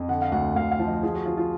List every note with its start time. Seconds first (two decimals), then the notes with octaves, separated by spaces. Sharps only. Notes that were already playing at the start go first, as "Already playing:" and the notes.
Already playing: F2
0.08 D3 F#5
0.22 F5
0.32 D2 F#5
0.56 D2 F5
0.71 F5
0.79 F3
0.87 D#5
1.03 F3 G#4
1.15 F#4
1.26 F3 F4
1.37 F4